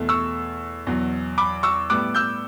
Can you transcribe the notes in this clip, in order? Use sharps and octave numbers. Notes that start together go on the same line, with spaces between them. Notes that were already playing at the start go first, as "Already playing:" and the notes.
Already playing: E2 B2 A3
C#6 E6
E2 B2 F#3
B5 D6
C#6 E6
A2 G3 B3 D6 F#6
E6 G6